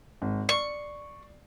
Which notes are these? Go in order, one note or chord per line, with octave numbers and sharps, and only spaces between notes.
G#1
D5 C#6 C7